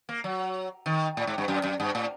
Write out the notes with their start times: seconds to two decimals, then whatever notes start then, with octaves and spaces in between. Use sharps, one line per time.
0.09 A#3
0.24 F#3
0.86 D#3
1.17 A2
1.27 G#2
1.38 G2
1.48 F#2
1.64 F#2
1.80 G2
1.95 A2